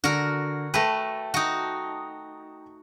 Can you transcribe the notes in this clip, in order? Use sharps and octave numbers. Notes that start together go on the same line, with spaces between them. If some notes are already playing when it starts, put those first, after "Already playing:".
D3 F#4 A#4
A3 B4 G5 A5 A#6
D#4 F#4